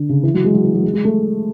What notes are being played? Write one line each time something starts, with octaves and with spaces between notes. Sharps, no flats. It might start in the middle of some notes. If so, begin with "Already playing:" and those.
Already playing: D3
C#3
E3
F#3
G#3
F#3
E3
F#3
G#3
G#3
A3